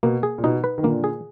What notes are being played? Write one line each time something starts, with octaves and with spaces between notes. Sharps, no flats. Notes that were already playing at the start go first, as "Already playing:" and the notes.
B2 A#3
G#4
A#2
B2 D#4
B4
D#3
A#2 D3 A#3
G#4